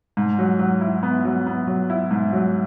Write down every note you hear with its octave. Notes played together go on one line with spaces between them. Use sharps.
G#2
F#3
F#3
E4
B3
F#3
B3
F#3
E4
G#2
F#3